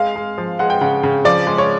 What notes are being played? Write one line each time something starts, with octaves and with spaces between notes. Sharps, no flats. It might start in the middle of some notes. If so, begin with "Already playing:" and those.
Already playing: G#3 F5
G#3
F3
G#3 F#5
G5
C#3 F#5
C#3
F3 D5
G#3
C#5